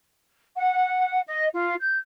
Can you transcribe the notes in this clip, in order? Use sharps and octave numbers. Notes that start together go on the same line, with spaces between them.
F#5
D#5
F4
G6